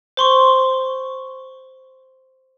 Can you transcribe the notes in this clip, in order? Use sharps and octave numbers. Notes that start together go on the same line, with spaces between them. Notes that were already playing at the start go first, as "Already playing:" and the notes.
C5 C6 C#6